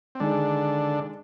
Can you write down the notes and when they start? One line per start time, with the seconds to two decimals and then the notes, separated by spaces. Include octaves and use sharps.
0.15 C4
0.20 D3 D#3 G#3 D4 D#4